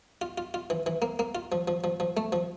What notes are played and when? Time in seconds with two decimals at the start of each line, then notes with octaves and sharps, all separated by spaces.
0.22 F4
0.38 F4
0.54 F4
0.70 E3
0.86 E3
1.02 A#3
1.19 A#3
1.35 F4
1.52 F3
1.68 F3
1.84 F3
2.00 F3
2.17 A3
2.32 F3